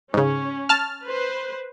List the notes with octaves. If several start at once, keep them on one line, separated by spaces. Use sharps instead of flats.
G#2 C#3 C#4
A5 F6
B4 C5